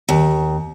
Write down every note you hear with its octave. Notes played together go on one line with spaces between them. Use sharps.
D#2